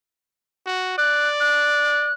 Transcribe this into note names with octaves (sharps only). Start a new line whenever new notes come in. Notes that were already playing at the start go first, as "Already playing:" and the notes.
F#4
D5 F#6
F#6